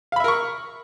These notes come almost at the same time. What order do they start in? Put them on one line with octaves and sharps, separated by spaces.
F5 B5 E5 A#4 C#6